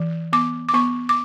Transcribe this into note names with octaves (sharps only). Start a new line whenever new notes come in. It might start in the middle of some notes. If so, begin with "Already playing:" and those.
Already playing: E3
B3 D6
D6
B3 C#6
D6